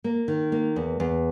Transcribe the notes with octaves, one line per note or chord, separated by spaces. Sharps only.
A#3
D#3
A#3
E2
E2